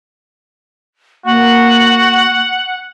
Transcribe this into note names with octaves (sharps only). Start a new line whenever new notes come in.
A#3 F#4 F#5